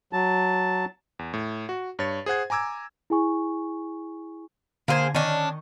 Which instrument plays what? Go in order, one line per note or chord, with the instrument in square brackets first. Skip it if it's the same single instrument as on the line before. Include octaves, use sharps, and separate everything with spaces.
[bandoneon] F#3 A5
[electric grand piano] E2
A2
F#4
G2 C#5 A6
G#4 C5 F#5 G#6
G#5 A#5 D6 E6 G#6
[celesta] E4 G#4 G#5 C#6
[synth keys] D3 G#6 [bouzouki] A#3 G#4 C5
[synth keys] D#3 D#5 C#6 [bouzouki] C#4 D4